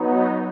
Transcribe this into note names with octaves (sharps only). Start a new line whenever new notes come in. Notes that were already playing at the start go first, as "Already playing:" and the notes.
Already playing: F#3 B3 D#4